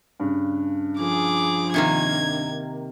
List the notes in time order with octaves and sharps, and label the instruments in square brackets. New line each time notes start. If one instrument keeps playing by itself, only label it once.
[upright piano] G2 C#3
[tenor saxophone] F3 [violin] G#4 D6
[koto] C3 D#3 A#3 [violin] G#6